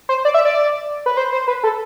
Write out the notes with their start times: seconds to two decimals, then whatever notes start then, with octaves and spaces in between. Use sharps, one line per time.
0.09 C5
0.25 D5
0.34 E5
0.45 D5
1.06 B4
1.17 C5
1.33 C5
1.48 B4
1.64 A4